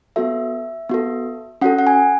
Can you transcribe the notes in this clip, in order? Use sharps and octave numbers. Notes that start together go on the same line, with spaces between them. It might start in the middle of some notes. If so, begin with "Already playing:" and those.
B3 F#4 A4 E5
B3 F#4 A4
C#4 F#4 A4 F#5
F#5
G#5